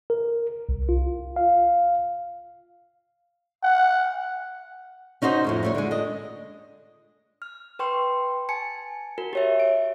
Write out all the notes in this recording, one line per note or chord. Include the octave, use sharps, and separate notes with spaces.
A#4
C2
F4
F5
F#5
C#4 D#4 F#4 C5 D#5
F2 A2 C#3
G3 A3 C#5
D3 G#3
D4 D#5
F6
B4 G5 C6 C#6
G#5 A5 C#7
F#4 A#4
G4 C#5 E5
D7